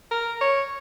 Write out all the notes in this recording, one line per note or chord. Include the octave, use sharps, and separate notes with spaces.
A#4
C#5